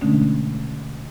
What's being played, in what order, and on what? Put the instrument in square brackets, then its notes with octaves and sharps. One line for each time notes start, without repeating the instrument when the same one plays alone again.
[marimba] B2 D3 G#3 A3 C#4 D4